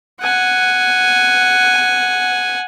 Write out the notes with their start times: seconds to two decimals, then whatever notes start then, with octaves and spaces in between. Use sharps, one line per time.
0.21 F#5 G#5